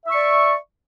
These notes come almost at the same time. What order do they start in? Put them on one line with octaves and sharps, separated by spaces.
E5 C#6 D5